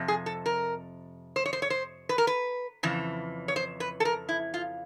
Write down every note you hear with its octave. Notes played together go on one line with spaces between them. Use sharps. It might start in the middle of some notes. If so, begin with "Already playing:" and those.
Already playing: F2 C3
G#4
A4
A#4
C5
C#5
C5
C#5
C5
B4
A#4
B4
F2 C#3 E3
C#5
C5
B4
A4
A#4
E4
F4